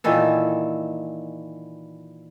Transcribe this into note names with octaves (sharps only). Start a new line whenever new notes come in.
A#2 D#3 E3 A4